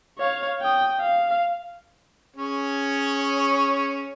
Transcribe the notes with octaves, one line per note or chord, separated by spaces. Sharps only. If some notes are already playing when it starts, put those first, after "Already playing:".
C#5 F5
G5 D#6
F5
C#4 G#4 C#5